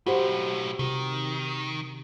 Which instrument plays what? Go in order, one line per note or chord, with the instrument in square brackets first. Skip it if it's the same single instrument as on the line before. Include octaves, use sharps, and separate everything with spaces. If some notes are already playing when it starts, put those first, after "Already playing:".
[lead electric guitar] B1 A2 [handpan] F#4 G4 C5
[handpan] C3 [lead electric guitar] D#3